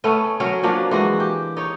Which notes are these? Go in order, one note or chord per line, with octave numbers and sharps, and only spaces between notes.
A3 B3 C#4
F#3 C#4 A#4 C#5
F3 F#3 A#3 D4
E3 G#3 F#4
G4
D#4 C#5